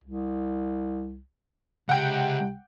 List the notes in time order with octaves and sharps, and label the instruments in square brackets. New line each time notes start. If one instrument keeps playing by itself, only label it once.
[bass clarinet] C2
[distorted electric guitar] C#2 [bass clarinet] C3 [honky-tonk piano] F#5 G5